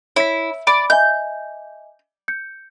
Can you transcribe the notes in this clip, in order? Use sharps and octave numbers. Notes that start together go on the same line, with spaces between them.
E4 C#5 B6
D5 B5
D#5 E5 G#5 G6
G6 C#7